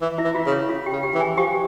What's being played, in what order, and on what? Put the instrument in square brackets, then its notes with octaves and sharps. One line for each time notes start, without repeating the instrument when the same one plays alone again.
[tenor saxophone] E3
[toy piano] E4 E5
[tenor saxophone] E3
[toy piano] F4 F5
[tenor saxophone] C#3
[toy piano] C#4 C#5
F4 F5
G4 G5
[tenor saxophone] C#3
[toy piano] G4 G5
[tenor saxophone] E3
[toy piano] G#4 G#5
[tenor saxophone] F3 [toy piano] G4 G5